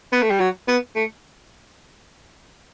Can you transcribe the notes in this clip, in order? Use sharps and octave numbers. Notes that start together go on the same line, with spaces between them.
B3
A3
G3
F#3
B3
A3